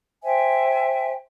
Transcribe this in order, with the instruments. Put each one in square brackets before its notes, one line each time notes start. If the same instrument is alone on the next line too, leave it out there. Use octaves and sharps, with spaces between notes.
[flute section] C5 E5 G5 G#5